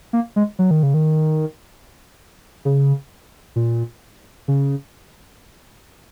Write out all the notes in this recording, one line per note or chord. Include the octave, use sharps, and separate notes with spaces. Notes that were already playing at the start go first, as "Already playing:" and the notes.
A#3
G#3
F#3
D#3
C#3
D#3
C#3
A#2
C#3